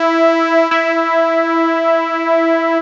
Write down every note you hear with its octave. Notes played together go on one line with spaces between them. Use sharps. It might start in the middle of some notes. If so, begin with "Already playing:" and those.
Already playing: E4
E4